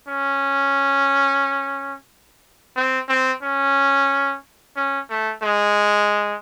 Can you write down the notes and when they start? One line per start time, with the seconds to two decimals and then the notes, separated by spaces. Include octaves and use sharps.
0.08 C#4
2.76 C4
3.09 C4
3.42 C#4
4.76 C#4
5.10 A3
5.42 G#3